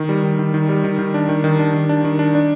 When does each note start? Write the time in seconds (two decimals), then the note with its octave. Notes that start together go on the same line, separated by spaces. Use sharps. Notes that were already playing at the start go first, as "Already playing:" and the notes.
Already playing: D#3
0.09 G3
0.23 D#3
0.39 D#3
0.54 D#3
0.69 G3
0.84 D#3
0.99 D#3
1.14 D4
1.29 D#3
1.44 D#3
1.59 D4
1.74 D#3
1.89 D4
2.04 D#3
2.19 D4
2.35 D4